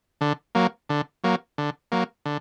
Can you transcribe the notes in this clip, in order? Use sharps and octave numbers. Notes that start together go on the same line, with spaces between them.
D3
F#3 A#3
D3
F#3 A#3
D3
F#3 A#3
D3